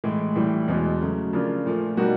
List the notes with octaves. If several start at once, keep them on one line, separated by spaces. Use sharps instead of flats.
A2 E3 G#3
A2 E3 G3
E2 B2 G#3
C#3 F#3 A3
C#3 F3 A#3 D4 F4
A#2 F3 A3
B2 G3 A#3 D#4 F#4